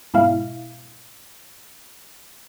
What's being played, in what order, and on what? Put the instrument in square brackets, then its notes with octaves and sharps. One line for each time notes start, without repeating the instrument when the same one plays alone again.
[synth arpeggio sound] G#2 B2 E4 F5